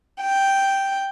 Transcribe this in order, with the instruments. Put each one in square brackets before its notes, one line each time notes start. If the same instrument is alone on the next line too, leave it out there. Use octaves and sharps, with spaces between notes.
[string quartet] G5